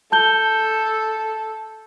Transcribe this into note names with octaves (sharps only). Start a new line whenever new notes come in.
A4 A5 G6 G7